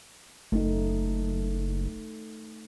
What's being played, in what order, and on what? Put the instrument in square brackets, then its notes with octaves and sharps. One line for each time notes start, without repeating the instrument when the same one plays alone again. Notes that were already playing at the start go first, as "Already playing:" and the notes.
[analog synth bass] F#1 [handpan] A3 D#4